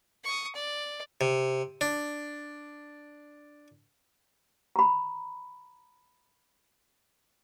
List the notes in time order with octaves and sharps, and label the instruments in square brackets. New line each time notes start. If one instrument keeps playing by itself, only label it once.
[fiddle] C#6 D#6
D5
[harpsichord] C3
D4
[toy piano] A#5 B5